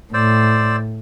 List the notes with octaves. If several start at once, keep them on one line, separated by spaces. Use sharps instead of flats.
A2 C5 D5 E6